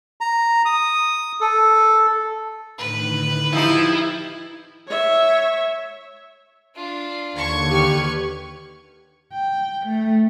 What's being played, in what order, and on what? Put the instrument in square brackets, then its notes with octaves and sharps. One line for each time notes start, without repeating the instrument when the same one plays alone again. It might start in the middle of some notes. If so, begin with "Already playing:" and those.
[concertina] A#5
D#6
A4
[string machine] A2 D3 D#3 [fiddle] B4
[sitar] F3 C4 D#4 [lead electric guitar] E4 [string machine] G4 E6
[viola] C#5 E5
[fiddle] D4 F4
[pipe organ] D#2 D3 [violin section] C#6 G#6
[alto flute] G4 [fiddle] B4 F6
[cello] G5
A3